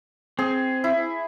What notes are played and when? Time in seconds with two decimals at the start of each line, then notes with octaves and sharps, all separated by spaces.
0.39 C4 G#4
0.84 E4